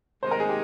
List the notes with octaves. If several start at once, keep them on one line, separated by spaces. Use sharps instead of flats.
C3 D#3 G#3 D#4 C5
A#4
G#4
G4